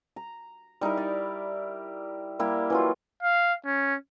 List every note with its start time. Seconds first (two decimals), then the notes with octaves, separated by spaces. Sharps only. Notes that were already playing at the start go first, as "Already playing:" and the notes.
0.16 A#5
0.81 G3 D#4 E4 A#4
0.97 D5
2.39 G3 A#3 E4 G4
2.70 E3 F#3 F4
3.23 F5
3.65 C#4